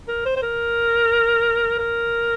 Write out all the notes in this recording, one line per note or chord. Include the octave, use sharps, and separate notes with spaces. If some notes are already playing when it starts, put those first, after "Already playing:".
A#4
C5
C5
A#4
A#4